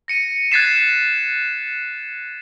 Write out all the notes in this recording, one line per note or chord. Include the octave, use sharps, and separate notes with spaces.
A#6 C#7 D#7
F#6 G#6 A6 B6 C7 E7